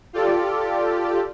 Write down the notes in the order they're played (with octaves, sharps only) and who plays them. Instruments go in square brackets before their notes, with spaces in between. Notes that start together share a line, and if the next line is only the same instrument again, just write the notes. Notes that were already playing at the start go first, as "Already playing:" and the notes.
[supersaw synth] F4 G4 A4 D5